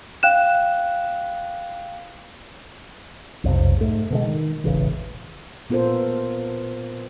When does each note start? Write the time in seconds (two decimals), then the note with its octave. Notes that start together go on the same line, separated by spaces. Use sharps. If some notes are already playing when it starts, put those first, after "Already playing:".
0.23 F5 G5 F#6 E7
3.44 B1 F2 C3
3.77 G#2 A3
4.10 B2 D3 G#3
4.24 D#3
4.64 E1 A1 C#3 E3
5.70 A#2 B3 F4 A4 A#4 C5